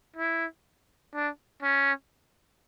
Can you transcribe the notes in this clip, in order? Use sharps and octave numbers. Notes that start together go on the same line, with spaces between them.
E4
D4
C#4